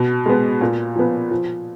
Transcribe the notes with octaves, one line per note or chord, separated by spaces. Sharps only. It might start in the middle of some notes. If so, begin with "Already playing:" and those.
Already playing: B2
G#3 B3
A#2
F3 B3
F3